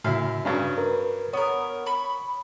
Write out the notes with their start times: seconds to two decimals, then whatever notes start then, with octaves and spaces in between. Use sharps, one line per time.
0.04 F#2 A2 C#3 E4 F5
0.45 G2 C#3 F#3 C#4 D4
0.78 A#4 B4
1.33 B3 A#4 C#5
1.86 B5 C#6